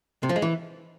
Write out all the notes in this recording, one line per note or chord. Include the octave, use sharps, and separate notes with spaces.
C3
F3
G#3
E3